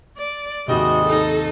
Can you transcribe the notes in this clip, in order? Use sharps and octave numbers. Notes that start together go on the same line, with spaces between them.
D5
D#2 G#2 C3 G3 G#3 F#4 D#5
D#4 A4